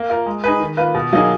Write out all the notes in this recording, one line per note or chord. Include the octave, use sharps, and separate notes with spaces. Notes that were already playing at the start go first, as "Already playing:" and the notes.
Already playing: A#3
F4 A#4
G#3
D#4 G#4 B4
D#3
A#3 F4 B4
B2
F#3 A#3 D#4 G#4